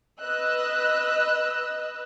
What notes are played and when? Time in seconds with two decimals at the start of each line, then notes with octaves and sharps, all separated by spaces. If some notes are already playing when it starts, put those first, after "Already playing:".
0.22 B4 D#5 E6 F#6